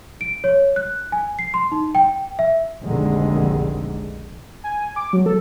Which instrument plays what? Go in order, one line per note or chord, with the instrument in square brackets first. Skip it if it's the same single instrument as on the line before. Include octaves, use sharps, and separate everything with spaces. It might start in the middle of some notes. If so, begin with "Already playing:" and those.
[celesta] D7
C#5
F#6
G#5
C7
C6
D#4
G5
E5
[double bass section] F1 A#1 F2 D3 D#3 G#3
[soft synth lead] G#5
D6
F#3
A4